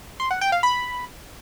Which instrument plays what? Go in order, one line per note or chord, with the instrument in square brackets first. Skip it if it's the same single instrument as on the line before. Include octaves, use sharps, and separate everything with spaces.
[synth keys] C6
F#5
G5
F5
B5